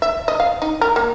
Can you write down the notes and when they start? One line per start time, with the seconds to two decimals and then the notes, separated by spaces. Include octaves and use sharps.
0.02 E5
0.28 D#5
0.40 F5
0.62 D#4
0.81 A#4
0.96 A#3